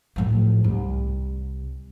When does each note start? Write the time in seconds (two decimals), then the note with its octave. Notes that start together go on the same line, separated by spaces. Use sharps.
0.16 A2 F3
0.64 C2